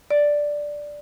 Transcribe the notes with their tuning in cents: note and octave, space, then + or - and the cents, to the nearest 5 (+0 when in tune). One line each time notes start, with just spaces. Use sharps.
D5 +0